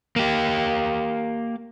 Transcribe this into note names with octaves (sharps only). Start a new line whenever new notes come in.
A#3 G4